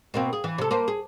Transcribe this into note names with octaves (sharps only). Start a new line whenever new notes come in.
B2 A#3 C4
G#4
E3
C3 A4
A#3 B4 C5
G#4